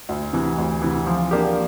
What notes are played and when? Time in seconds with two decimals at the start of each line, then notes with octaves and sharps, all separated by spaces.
0.09 D2
0.33 C3 E3
0.58 D2
0.82 C3 E3
1.06 F3
1.31 A#3 D4 G4